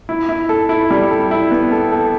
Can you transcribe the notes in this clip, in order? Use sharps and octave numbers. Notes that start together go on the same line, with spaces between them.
E4
E4
A4
E4
G3
A4
E4
B3
A4
A4